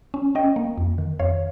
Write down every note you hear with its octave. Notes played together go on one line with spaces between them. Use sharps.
C#4
C#4 D#5 G5
A#3
F2
D#3
F2 C#5 F5